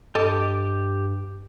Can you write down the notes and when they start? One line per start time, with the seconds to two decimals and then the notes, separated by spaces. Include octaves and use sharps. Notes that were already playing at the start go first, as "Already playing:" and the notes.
0.15 G2 G4 A4 D#5 D6